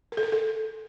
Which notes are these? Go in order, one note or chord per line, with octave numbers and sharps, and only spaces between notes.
A#4
A4
A#4
A4